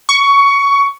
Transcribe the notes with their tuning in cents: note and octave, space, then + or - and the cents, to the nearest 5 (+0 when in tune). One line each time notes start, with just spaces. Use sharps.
C#6 +15